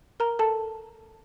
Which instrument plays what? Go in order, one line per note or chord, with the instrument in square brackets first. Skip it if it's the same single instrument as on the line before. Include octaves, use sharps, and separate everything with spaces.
[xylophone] A#4 A#5
A4 A5